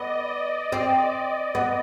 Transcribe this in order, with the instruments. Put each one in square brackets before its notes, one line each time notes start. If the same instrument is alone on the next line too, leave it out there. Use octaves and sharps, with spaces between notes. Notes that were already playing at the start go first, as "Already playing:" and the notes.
Already playing: [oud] B3 [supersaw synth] D5 D#5
[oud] C4
B3